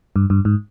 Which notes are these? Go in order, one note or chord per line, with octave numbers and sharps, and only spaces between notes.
G2
G2
G#2